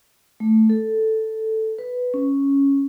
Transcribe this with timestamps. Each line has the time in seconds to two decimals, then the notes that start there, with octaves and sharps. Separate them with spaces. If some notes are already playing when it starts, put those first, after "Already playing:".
0.40 A3
0.70 A4
1.79 B4
2.14 C#4